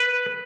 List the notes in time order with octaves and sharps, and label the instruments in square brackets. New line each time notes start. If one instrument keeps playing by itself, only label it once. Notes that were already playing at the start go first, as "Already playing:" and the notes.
Already playing: [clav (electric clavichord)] B4